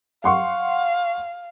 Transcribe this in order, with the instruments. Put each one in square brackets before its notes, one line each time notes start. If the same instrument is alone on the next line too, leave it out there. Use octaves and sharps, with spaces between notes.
[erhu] F5 [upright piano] F#5 C6 C#6